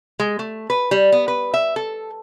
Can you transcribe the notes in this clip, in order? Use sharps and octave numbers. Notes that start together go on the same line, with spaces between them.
G#3
A3
B4
G3
B3
B4
E5
A4